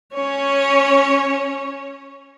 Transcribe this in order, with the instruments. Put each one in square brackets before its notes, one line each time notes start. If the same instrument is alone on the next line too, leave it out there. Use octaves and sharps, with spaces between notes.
[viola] C#4 C#5